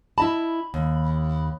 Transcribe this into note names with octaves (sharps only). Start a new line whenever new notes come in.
E4 D#5 A5 B5
D#2